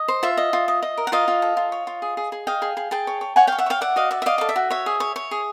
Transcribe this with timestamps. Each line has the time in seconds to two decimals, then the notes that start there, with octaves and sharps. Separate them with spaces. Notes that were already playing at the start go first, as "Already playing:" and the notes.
Already playing: D#5
0.08 C5
0.23 F4 E5
0.37 D#5
0.53 F4
0.68 D#5
0.82 D#5
0.97 A#4
1.07 F#5
1.12 F4 D#5 F5
1.28 F4
1.42 A4
1.57 F4
1.72 C#5
1.87 F4
2.02 G#4
2.17 G#4
2.32 G#4
2.47 D#5 F5 G5
2.62 G#4
2.77 G#4
2.91 G#4 G5 A5
3.07 C#5
3.21 C#5
3.36 C#5 F#5 G#5
3.47 C#5 F5 G5
3.58 E5 F#5
3.66 C#5 F5 G5
3.81 D5 E5 F#5
3.96 F#4 D#5 F5
4.11 D5 E5
4.22 E5
4.26 D5 D#5 F5
4.38 A4 F5
4.49 E5
4.56 F#4
4.70 C#5 E5
4.86 G#4
5.00 C#5
5.16 C#5
5.31 G#4